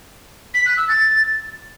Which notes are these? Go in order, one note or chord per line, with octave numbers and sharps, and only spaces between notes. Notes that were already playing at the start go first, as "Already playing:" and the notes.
B6
F#6
E6
A6